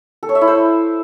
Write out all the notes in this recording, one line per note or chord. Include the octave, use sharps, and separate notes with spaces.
A4
C#5
E5
E4
C5